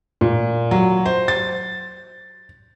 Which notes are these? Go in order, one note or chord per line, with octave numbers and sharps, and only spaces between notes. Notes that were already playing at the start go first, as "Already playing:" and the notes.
A#2
F#3
C5
A6